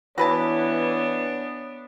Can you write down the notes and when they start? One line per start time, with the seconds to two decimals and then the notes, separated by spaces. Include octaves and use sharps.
0.18 E3 B3 D4 F#4 B4 C#5 A5